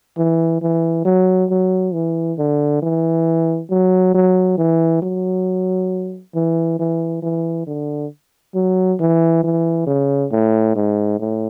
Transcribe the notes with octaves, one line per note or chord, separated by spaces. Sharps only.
E3
E3
F#3
F#3
E3
D3
E3
F#3
F#3
E3
F#3
E3
E3
E3
D3
F#3
E3
E3
C#3
A2
G#2
A2